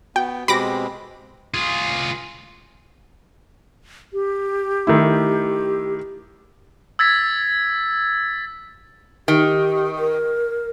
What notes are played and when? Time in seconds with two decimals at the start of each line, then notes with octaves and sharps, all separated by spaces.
0.16 B3 F#4 G5
0.48 B2 G#3 C4 F#4 G4 B5 D6 A#6
1.54 F4 G#4
4.13 G4
4.87 D#3 A3 E4
6.99 E6 G#6 A6 B6
9.28 D#3 G4
9.99 A#4